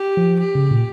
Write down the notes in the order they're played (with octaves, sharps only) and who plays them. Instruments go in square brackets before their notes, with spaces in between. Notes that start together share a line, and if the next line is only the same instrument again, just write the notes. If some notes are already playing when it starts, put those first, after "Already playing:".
Already playing: [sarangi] G4
[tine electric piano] F3
[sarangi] G4
[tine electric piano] C#3
A#2